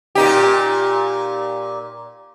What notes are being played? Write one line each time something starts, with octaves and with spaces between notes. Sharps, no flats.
A#2 D#4 G4